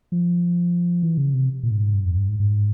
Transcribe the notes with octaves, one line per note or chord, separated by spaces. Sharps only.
F3
E3
C#3
C3
A#2
G#2
G2
F2
G2
G#2
G#2